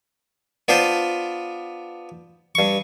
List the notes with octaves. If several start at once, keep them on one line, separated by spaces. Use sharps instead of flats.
B3 D4 F4 B4 C5
G2 C#6